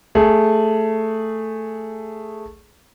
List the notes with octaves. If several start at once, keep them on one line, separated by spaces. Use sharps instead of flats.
A3 G#4